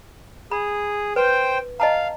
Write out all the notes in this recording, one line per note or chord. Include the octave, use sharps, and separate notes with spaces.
G#4 B5
B4 C5 G5
D#5 F5 A5 A#5